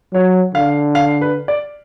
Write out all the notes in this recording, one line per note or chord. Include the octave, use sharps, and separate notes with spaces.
F#3 C#5
D3 F5
F5
B4
D5